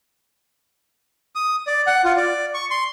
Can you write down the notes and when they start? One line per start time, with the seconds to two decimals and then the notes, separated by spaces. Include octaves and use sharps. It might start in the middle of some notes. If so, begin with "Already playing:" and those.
1.35 D#6
1.67 D5
1.87 F#5
2.04 F4
2.17 D5
2.54 C#6
2.71 C6